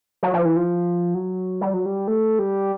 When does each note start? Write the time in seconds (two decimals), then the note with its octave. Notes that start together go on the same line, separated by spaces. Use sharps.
0.23 F#3
0.33 F3
0.45 E3
0.56 F3
1.14 F#3
1.61 G3
1.74 F#3
1.86 G3
2.08 A3
2.39 G3